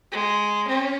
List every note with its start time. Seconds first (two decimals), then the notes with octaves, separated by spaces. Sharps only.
0.12 G#3
0.67 C#4